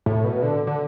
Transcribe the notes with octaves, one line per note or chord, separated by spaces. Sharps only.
A2
B2
D3
D3